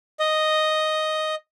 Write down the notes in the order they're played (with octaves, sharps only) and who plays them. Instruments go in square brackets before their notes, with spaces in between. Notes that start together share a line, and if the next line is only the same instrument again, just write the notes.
[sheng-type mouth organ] D#5